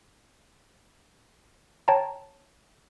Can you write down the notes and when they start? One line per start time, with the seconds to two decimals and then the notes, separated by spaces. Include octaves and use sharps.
1.88 C#5 G5 A5 A#5